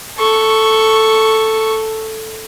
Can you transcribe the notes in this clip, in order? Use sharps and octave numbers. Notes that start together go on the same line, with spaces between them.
A4 C#6